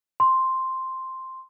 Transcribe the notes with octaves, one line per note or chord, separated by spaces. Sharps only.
C6